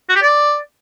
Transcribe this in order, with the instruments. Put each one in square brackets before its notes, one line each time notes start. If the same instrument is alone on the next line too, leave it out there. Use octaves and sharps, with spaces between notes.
[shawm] F#4
G4
D5